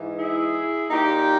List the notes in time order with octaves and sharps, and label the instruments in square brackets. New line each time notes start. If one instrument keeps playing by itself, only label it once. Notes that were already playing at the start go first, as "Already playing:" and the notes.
Already playing: [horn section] G#2 E3
E4 G#4
A#2 D#4 G4